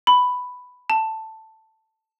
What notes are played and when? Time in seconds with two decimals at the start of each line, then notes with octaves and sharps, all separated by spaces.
0.07 B5
0.90 A5